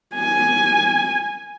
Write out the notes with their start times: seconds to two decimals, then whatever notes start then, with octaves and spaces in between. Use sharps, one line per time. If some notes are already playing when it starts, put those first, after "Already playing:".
0.15 G#5